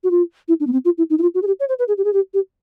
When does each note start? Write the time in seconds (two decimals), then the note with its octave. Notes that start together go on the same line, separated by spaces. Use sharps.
0.04 F#4
0.11 F4
0.48 E4
0.60 D4
0.67 B3
0.73 C4
0.85 F4
0.98 E4
1.10 D#4
1.18 E4
1.22 F4
1.34 F#4
1.42 G#4
1.47 G4
1.60 C#5
1.69 C5
1.79 B4
1.88 G#4
1.97 G4
2.04 G#4
2.13 G4
2.34 G4